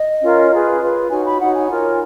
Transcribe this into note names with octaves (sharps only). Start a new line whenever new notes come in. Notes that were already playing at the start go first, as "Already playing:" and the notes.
Already playing: D#5
C#4 F4 A#4 C#5
F4 G#4 B4
F4 B4
D#4 F#4 C#5 G#5
B5
D#4 F#4 C#5 F#5
G#5
F4 A#4 C#5